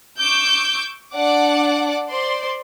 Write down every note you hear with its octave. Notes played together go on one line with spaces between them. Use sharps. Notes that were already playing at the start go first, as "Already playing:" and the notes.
C#6 D6 E6 G6
D4 D5 F#5 D6
C5 D5 C6